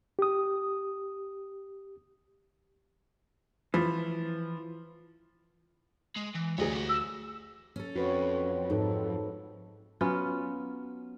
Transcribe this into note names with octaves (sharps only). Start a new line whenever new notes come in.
G4 D#6
E3 F3
G#3
E3
D2 G#4 C#5 D#5
G4 F#5
E6
C#4 A4
F2 F#4 B4 C#5
G#2 D#4 A4
F#3 B3 C#4 F4